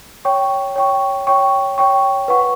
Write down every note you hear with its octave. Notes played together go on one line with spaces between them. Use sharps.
C#5 G5 C#6
C#5 G5 C#6
C#5 G5 C#6
C#5 G5 C#6
B4 F#5 C#6